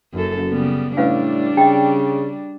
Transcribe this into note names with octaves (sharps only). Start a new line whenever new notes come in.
F#1 F#2 A4
C#3 G3 B3
A2 G3 C#4 D4 B4 F5
C#3 D#5 G5